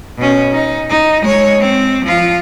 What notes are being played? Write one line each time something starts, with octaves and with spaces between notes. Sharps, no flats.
B2 C#4
D#4
D#4
G#3 C#5
C4
F3 F4